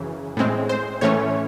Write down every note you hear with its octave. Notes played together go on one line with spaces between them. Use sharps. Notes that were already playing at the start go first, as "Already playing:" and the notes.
Already playing: F#2 C#3 E3
A2 G#3 C4
C5
A2 E3 A3 C#4 C#5